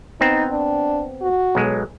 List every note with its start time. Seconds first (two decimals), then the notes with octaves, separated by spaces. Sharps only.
0.21 B3 C4 D#4
0.50 D4
1.21 F#4
1.55 B1 F#3 G#3